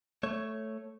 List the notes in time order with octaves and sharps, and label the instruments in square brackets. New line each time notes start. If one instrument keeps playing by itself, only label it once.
[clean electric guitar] A3 C#5